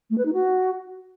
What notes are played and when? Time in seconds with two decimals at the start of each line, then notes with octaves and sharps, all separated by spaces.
0.10 A3
0.18 B4
0.25 D#4
0.33 F#4